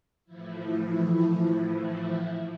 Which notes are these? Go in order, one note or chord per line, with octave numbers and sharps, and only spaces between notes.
A2 E3 F3 E4